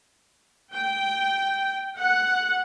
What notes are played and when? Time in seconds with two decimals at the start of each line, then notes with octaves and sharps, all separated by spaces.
0.73 G5
1.98 F#5